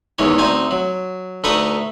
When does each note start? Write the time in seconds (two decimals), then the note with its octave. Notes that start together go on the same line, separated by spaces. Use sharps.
0.18 E2 G#2 D#3 E3 C#5
0.38 D2 C4 D#4 G#5
0.71 F#3
1.44 D2 A3 D#4 B4 C#6 D#6